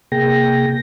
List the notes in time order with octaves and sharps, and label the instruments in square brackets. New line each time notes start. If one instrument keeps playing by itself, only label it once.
[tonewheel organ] C3 A#3 G#4 G5 A#6